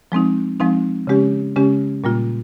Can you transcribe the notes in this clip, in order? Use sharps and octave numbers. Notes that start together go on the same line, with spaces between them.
F3 G#3 C4 D#4
F3 G#3 C4 D#4
C#3 G#3 C#4 G4
C#3 G#3 C#4 G4
A#2 G3 A#3 F4